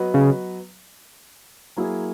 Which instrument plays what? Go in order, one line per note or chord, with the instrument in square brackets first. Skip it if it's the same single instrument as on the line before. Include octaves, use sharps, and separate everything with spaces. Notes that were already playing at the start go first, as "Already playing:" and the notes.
Already playing: [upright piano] F#3 B3 F#4 B4 D#5
[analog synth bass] C#3
[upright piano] F#3 A#3 E4 G#4